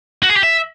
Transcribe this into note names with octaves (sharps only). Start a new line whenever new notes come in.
F#4
G#4
G4
E5